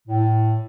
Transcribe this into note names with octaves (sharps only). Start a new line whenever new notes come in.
A2